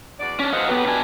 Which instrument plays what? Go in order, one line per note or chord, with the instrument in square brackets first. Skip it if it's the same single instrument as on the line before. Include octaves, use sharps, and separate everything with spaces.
[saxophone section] E2 F#4 D5
[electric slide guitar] C#4 D4
[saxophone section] F#2 E3 F#5 [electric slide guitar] C5 D#5 F5
[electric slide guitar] F#3 B3 [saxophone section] G4 B4
[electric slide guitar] B2 D4 G#5